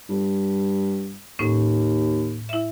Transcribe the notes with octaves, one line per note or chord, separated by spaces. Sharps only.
G2
D#2 A2 C#4
E4 E5